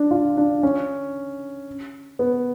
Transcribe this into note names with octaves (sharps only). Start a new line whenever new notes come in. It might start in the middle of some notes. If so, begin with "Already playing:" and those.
Already playing: D4
F4
D4
C#4
B3